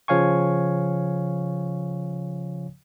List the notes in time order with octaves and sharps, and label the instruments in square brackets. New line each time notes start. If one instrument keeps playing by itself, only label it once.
[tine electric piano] C#3 F3 C#5 F5 G#5 C#6